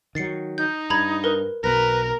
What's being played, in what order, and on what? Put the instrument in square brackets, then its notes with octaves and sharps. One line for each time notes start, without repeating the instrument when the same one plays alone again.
[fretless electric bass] D#3 F#3 [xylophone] A6 C7 C#7
[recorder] D#4 [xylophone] G6
[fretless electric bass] G2 [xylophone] A#5 B5 G#6
[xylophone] A#4 B4
[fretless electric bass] B1 B2 [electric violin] A#4 [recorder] B4 [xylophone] A#6